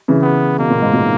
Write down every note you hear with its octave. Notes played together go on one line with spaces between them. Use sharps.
C#3 E3
B3
B2 A#3
A#2
G#2
A#2